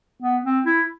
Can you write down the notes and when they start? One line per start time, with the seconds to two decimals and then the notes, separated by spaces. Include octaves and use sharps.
0.22 B3
0.44 C4
0.66 E4